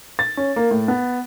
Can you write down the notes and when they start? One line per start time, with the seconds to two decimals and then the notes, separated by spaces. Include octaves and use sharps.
0.19 A6
0.37 C#4
0.56 A#3
0.71 A2
0.88 B3